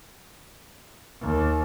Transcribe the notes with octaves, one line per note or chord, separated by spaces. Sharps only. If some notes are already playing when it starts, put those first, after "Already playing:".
D#2